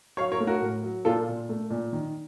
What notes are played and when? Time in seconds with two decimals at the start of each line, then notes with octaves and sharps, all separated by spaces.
0.17 F#3 C#5 F5
0.32 A#4 C#5
0.40 A3
0.47 F#4 A#4
0.62 A2
0.83 F#3
1.05 A#2 F4 A4
1.28 A#2
1.49 A3
1.70 A#2
1.93 D#3